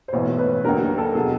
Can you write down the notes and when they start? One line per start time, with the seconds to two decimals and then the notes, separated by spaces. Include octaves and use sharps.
0.08 C5
0.13 B1 A2 E3 C#5
0.38 B4
0.64 D#2 D3 F#3 A#4
0.98 A4
1.15 B2 F#3 G#4